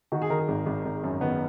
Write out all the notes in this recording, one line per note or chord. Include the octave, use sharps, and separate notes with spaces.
D#3 F#4
G#4
D#3 A#4
G#4
G#1
G#1
G#1
F#2
D#3 B3